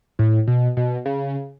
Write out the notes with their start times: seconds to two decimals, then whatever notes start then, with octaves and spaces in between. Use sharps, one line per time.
0.19 A2
0.47 B2
0.77 B2
1.06 C#3